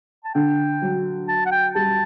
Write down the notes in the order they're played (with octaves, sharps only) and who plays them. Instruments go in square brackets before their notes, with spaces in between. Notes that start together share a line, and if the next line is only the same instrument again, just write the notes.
[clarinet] A5
[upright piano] D3 [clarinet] G5
[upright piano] F#3
[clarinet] A5
F#5
G5
[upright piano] G3 [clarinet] A5